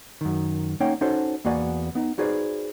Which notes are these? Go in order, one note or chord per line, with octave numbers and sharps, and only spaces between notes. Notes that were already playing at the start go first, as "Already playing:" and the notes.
F#2 D#3
A#3 C#4 D#4 C#5 F#5 G5
C#4 D#4 F#4 A4 C5 C#5
E2 A#3 B3 F#4 D5 G#5
B3 D#4
D#4 F#4 G#4 B4 C5 D5